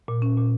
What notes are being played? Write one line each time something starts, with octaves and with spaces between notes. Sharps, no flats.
A#2
C#4
A#2